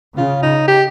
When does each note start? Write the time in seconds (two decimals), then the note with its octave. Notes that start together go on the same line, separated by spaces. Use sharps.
0.17 C#3 F4
0.43 D#4
0.68 G4